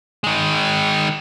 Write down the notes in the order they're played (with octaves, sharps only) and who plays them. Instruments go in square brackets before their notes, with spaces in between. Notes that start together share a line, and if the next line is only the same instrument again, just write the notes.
[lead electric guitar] D#3 G#3